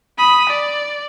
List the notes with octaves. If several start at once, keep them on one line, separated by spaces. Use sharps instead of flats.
B5 D#6
D5